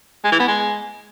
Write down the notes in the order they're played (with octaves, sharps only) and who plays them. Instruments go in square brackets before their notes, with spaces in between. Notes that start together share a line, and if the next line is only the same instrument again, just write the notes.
[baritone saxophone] G#3
E3
B3
G#3